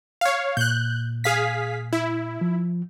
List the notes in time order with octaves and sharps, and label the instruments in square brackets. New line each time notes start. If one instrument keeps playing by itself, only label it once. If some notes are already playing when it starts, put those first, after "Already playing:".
[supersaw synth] C#5 F5
[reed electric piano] A#2 [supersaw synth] F#6 G6
[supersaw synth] G#4 F5 B6
E4
[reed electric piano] F3